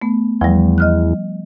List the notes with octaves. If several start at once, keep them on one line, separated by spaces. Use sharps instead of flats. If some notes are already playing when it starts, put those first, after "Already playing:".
A3 B3
E2 F3 G3
D#5 F6 F#6